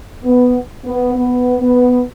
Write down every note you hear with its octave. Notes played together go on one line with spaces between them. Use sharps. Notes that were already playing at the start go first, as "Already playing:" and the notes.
B3
B3
B3
B3